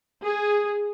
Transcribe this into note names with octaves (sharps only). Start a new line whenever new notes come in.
G#4